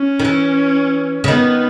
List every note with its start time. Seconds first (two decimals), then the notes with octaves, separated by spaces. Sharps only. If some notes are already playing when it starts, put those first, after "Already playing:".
Already playing: C#4
0.19 D#3
0.25 E3
1.24 C#3
1.28 D#3 B3